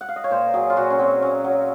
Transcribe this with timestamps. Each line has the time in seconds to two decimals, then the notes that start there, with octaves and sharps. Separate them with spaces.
0.01 F#5
0.09 F5
0.16 D#5
0.24 C#5
0.31 A#2 C5
0.46 A#4
0.54 F#3 G#4
0.70 F4
0.77 A#2 F#4
0.90 C#4
0.99 F#3 C4
1.22 A#2 C#4
1.44 F#3